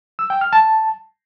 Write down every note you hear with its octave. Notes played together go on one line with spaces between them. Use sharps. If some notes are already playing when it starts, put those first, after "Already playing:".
E6
G5
F6
A5